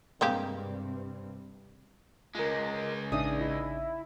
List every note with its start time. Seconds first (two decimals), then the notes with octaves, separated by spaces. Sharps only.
0.21 G2 C3 G#3 A#3 C4 G4
2.35 C#2 G#3 F4 A#4
3.12 A1 C#3 D4 D#4 G#4 E5 D#6
3.40 E4